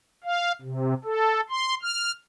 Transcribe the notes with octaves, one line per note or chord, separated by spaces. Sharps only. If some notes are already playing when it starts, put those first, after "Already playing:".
F5
C3
A4
C6
F6